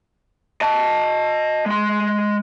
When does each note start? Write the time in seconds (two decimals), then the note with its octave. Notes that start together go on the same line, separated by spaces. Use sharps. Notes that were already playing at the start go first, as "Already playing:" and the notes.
0.61 D#5 A5
1.66 G#3 C6